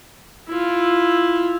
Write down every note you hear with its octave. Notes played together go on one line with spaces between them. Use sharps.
E4 F4